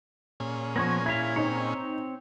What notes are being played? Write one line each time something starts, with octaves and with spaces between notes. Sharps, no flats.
A#2 C#4 G#4
F3 B3 C#6 G#6 A#6
E4 F5 G#6 B6
C4 D#4 C#5